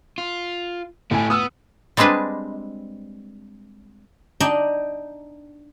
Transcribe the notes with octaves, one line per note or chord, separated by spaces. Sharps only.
F4
A2 A3 G4 G#5
B3 D#6 E6
G3 G#3 C4 D4 B4 D#5
D4 D#4 D#5 G5